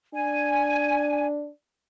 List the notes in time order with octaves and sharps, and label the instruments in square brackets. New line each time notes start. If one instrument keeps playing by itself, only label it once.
[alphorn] D4 [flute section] G#5